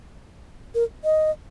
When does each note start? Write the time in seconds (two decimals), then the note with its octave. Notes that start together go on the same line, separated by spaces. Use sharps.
0.75 A#4
1.04 D#5